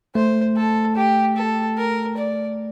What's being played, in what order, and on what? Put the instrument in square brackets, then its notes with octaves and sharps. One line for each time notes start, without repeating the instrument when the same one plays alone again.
[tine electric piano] A3 [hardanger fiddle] C5
[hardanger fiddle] A4
G4
A4
A#4
D5